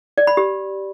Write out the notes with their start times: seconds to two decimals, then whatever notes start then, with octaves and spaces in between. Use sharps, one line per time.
0.18 D5
0.27 B5
0.37 G4